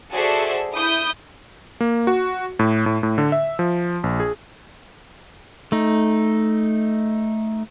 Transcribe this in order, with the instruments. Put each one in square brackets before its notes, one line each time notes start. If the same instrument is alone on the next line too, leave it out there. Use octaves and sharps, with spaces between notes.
[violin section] F#4 G#4 A4 C5 D5 E5
E4 D#6 G6
[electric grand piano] A#3
F#4
A2
A2
A2
D3
E5
F3
A#1
G#4
[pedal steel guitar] A3 D#4